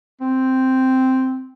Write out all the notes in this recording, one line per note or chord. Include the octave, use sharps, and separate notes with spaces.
C4